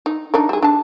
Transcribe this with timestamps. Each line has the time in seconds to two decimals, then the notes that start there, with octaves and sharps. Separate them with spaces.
0.06 D#4
0.34 D4 D#4 A#4
0.49 G3 G#4
0.62 D4 A5